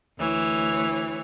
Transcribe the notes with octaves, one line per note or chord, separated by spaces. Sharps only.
D2 E3 C#5